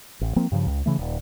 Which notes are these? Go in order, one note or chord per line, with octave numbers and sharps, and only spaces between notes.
A1
F3 A#3 C4
G2 C#3 F3
C#2
C#3 E3 A3
D#1